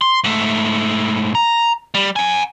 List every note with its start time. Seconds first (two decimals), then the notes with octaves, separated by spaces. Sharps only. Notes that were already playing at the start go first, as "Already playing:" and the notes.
0.01 C6
0.24 G#2 A3
1.35 A#5
1.94 G3
2.16 F#5 G#5